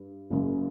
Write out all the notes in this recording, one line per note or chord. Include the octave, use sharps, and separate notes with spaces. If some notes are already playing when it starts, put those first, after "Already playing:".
Already playing: G2
F#1 F#2 C#3